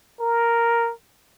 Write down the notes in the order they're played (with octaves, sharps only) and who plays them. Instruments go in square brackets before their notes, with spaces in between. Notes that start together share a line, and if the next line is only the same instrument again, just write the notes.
[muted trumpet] A#4